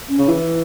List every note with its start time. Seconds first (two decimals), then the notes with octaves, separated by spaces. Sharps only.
0.09 C#4
0.18 C#3
0.28 E3 E4